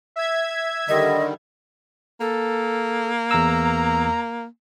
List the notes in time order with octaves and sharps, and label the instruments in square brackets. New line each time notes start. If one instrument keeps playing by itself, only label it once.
[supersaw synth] E5 G#6
[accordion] D3 D#3 G3 [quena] D#5
[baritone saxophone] A#3 [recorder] A4
[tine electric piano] E2 E6 [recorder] A#5